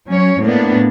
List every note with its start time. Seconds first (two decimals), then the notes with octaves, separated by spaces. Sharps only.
0.11 F#3 C#4 C#5
0.42 A2 A#3 B3 D4